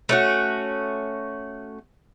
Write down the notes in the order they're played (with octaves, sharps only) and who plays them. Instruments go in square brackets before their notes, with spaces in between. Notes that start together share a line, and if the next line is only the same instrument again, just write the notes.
[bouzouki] A3 C#4 F#4